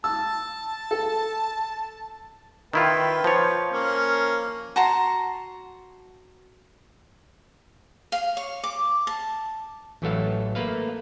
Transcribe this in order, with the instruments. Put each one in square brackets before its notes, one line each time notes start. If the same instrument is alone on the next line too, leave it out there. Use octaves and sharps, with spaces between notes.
[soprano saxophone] A5 [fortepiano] E6
[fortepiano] A4
[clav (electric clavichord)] D#3 E4 F4 [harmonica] B4 G5
[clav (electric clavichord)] F3 C#5
[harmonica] A#3 C#4
[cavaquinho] F#4 A5 A#5 C6
F5
C#5
D6
A5
[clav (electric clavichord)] A1 E3 F#3 A3 A4 F5
A3 A#3 B4 F5